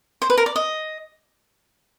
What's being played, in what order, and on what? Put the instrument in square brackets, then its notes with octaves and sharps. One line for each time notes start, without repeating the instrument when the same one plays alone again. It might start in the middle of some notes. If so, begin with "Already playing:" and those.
[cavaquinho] C5
B4
A#4
D5
D#5